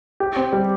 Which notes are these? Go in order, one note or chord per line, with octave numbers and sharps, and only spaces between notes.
G4
C4
G3